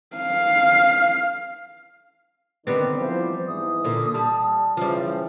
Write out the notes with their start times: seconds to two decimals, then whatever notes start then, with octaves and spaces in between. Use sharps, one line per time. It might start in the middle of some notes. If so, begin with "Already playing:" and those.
0.17 F5
2.67 D3 D#3 G3 B3 C4 D6
2.99 E3 F3 C5
3.47 G#2 E3 D#6
3.84 A#2 D3
4.15 G3 A5
4.77 C#3 E3 F3 G3 C5